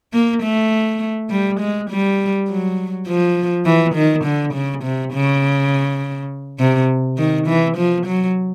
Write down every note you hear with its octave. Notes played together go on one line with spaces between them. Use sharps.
A#3
A3
G3
G#3
G3
F#3
F3
E3
D#3
D3
C#3
C3
C#3
C3
D#3
E3
F3
F#3